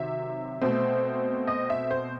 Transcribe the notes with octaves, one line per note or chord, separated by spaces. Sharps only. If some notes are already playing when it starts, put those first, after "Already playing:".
Already playing: C3 D#3 F#3 E5
B2 A3 C4
D#5
E5
C5